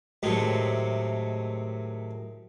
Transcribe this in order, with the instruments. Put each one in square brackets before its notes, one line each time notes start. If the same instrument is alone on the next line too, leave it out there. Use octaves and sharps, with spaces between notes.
[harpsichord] A2 C3 D#3 F#3 G#3 A3